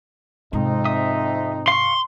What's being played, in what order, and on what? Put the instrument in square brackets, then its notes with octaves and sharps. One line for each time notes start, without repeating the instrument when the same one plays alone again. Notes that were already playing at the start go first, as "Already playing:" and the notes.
[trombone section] F2 C4 D#4 [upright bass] G#2 C3
[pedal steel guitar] E5 D#6
[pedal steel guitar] F5 C#6 [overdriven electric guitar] C6